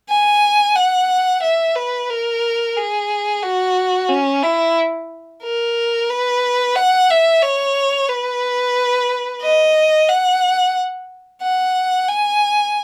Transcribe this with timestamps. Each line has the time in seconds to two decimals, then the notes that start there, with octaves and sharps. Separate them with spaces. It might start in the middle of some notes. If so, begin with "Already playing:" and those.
0.09 G#5
0.76 F#5
1.43 E5
1.76 B4
2.10 A#4
2.77 G#4
3.43 F#4
4.09 C#4
4.43 E4
5.43 A#4
6.10 B4
6.75 F#5
7.10 E5
7.43 C#5
8.09 B4
9.42 D#5
10.09 F#5
11.43 F#5
12.09 G#5